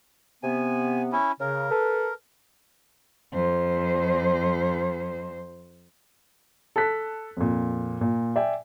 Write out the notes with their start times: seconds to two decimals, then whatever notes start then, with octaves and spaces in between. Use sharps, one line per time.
0.43 C3 B3 G#5
1.12 C#4 E4
1.40 C#3 A#4
1.71 A4 B4
3.33 F2 C5
6.76 A4 A5 F#6 B6
7.37 F2 A#2
8.01 A#2
8.36 D5 E5 G5 G#5